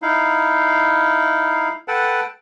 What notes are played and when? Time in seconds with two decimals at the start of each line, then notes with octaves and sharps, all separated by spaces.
0.02 D#4 E4 F5
1.88 A4 B4 F#5 G5 A5